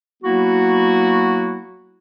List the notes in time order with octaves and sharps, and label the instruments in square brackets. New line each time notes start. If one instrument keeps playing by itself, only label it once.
[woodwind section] F#3 A#3 B3 E4 F#4